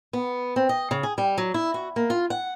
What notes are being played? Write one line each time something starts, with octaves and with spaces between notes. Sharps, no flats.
B3
C4
D#5
C#3
G#4
G3
F#3
E4
F#4
A#3
F4
F#5